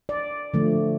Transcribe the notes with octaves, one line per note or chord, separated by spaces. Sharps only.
D5
D3 F3 A3